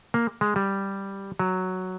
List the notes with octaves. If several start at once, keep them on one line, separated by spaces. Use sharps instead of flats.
A#3
G#3
G3
F#3